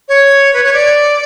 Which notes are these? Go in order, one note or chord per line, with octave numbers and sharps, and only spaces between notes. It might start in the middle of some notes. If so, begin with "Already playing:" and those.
C#5
B4
C#5
D5